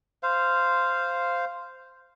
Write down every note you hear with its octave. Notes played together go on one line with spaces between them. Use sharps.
C5 F5